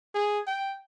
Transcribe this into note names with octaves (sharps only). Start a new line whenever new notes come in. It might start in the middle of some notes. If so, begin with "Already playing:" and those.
G#4
G5